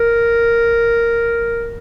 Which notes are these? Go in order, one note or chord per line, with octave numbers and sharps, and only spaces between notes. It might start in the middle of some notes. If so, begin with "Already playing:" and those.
Already playing: A#4